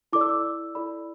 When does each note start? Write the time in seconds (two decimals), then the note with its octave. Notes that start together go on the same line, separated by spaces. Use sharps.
0.13 E4 A4 D5 D6
0.21 E6
0.29 D6
0.75 E4 A4 D5 B5